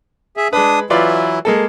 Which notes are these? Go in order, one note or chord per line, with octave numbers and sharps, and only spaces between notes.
G#4 E5
G#3 D4 B4 D#6
E3 F#3 E4 F4 B4 D5
G#3 A#3 A4